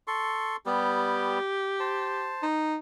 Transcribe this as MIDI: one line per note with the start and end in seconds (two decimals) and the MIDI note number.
0.07 0.56 69
0.07 0.56 84
0.07 0.56 85
0.66 1.39 55
0.66 1.39 59
0.66 2.33 67
1.80 2.46 72
1.80 2.46 81
2.43 2.76 63